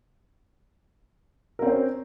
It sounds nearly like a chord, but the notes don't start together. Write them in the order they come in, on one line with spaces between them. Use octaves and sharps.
A#4 C4 C#4 C5